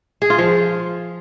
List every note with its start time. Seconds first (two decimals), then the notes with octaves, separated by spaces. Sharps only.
0.22 G#4
0.30 F4
0.38 F3